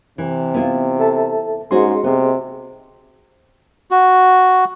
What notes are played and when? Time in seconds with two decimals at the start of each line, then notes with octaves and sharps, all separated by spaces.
0.18 C3 E3
0.54 B3 E4 F4
0.99 A4 E5 A5
1.71 G#2 C4 C#4 F#4 G#4 D#5 C6
2.04 C3 B3
3.91 F#4